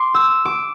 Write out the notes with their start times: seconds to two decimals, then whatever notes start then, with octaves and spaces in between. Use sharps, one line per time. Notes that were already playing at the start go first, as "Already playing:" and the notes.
Already playing: C6 D6
0.14 E6
0.45 D6